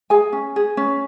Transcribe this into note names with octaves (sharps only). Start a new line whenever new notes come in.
G#4 G#5
C#4
G#4
C#4